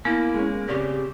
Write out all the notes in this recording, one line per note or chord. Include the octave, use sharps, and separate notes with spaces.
A#3 B3 E4
G#3 C#4
C#3 C4 G4 D5